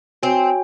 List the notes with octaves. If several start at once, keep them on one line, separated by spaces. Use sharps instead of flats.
C4 F#4 C#5 G#5